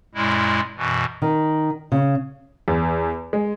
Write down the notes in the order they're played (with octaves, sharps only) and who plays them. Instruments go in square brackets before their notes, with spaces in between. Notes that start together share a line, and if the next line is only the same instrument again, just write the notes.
[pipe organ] F#2 A#2 G#3 E4
F#2 B2 E3
[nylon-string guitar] D#3
C#3
[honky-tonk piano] E2
G#3